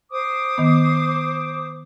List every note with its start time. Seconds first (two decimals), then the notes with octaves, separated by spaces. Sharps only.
0.12 C5 D6 D#6
0.58 D#3 B3